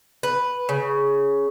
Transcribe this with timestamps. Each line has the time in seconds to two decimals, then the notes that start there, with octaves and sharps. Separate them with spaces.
0.23 B4
0.69 C#3